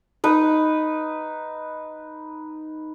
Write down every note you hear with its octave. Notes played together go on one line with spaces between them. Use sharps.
D#4 B4